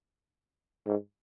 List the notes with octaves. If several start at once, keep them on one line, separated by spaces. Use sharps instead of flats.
G#2